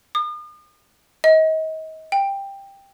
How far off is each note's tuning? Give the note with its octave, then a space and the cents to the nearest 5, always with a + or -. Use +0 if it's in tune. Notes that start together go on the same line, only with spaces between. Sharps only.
D#6 -45
D#5 +30
G5 +10